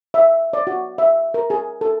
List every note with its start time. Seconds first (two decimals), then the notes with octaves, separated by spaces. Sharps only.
0.14 E5
0.53 D5
0.67 F#4
0.98 E5
1.34 A#4
1.50 G#4
1.81 A4